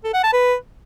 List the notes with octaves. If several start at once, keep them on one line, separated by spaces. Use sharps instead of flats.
A4
F#5
A5
B4